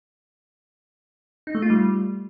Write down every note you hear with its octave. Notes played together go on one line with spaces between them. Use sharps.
D#4
A3
F4
G3